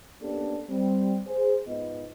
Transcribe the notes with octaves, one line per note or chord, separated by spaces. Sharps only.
A#3 B3 C#4 D4 G4 A4
G3 C4
G#4 C5
G#2 B3 F4 D#5